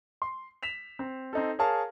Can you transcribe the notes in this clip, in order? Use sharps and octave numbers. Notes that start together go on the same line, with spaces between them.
C6
B6 E7 F7
C4
C4 D#4 A4
G#4 A#4 C#5 F5 A5